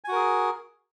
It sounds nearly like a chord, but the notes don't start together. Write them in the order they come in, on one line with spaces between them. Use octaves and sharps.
G#5 F#4 A#4 G#4